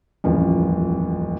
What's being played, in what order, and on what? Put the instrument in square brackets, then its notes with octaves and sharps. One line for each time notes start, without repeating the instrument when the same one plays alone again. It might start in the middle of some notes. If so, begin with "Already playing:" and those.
[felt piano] D#1 A1 F2